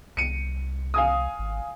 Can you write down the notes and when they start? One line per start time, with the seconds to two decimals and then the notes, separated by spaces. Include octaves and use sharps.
0.17 C2 C#7 D#7
0.94 F5 G#5 D#6
1.39 G#1